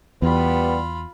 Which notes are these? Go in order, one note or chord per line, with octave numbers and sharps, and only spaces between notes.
E2 G3 B3 F4 B5